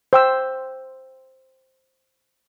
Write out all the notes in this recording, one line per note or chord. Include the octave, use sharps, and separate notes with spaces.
C5 G5 E6